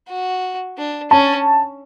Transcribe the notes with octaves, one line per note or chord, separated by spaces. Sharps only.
F#4
D4
C#4 A5